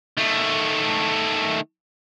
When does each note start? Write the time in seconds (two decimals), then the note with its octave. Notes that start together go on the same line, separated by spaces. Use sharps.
0.18 D#3 A3